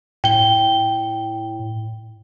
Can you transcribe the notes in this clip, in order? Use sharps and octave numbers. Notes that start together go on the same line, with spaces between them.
A2 G5 G7